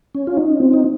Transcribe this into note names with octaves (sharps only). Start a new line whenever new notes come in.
C#4
F4
D#4
C4
D#4